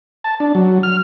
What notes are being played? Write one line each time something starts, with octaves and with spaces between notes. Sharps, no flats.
A5
D4
F#3
F6